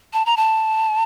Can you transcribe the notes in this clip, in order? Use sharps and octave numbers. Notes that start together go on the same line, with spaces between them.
A5
A#5
A5